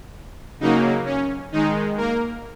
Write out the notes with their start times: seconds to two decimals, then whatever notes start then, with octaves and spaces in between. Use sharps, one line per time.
0.60 C#3 F#3 A#3 D#4
1.05 C#4
1.52 D#3 G#3 D#4
1.97 A#3 A#4